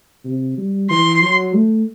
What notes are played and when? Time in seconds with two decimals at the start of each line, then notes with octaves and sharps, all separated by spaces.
0.25 C3
0.58 G3
0.90 E3 C6
1.23 F#3
1.55 A3